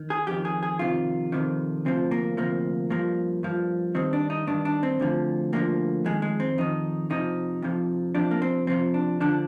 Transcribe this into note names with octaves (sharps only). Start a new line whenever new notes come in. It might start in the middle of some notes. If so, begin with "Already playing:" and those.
Already playing: D#3
G#4
F2 D#3 G4
G#4
G#4
F2 C3 D#3 F4
F2 C3 D#3
D2 C3 F3 C4
A#3
D2 C3 F3 A#3
G2 F3 A#3
G2 F3
G2 D#3 C4
D4
D#4
G2 D#3 D4
D4
C4
D2 D3 F3
D2 D3 F3 A#3
F2 D#3 G#3
G#3
C4
F2 D#3 D#4
F2 C3 F3 D#4
F2 C3 F3
F2 C3 F3 D4
A#3
C4
F2 C3 F3 C4
D4
D3 F3 D4